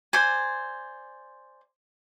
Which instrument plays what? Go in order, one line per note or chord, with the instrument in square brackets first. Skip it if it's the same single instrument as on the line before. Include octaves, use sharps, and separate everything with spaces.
[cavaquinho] C5 D5 G#5